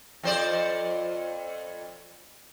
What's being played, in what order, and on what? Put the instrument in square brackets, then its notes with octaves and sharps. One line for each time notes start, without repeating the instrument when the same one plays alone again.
[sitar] F2 C5 D5